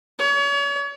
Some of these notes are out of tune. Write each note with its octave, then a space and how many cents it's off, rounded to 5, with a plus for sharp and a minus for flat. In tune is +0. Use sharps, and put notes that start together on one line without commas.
C#5 +35